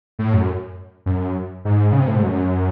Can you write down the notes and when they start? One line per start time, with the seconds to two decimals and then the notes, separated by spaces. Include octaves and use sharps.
0.19 A2
0.33 F#2
1.06 F#2
1.65 G#2
1.92 C#3
1.99 C3
2.08 A2
2.16 G#2
2.23 F#2